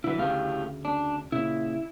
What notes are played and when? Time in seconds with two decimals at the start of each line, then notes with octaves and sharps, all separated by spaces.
0.04 D3 D#3 F#3 E4 B4
0.18 D2 A2 C#3 G4 F5
0.85 D4
1.32 A#2 C#3 E4